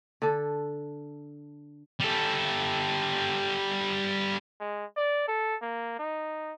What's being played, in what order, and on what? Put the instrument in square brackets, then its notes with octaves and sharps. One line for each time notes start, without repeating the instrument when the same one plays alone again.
[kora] D3 A4
[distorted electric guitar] G3 A4
[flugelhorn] G#3
D5
A4
A#3
D#4